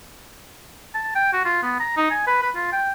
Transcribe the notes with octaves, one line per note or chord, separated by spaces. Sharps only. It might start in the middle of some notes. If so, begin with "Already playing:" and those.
A5
G5
F#4
F4
B3
A#5
D#4
G#5
B4
B4
F4
G5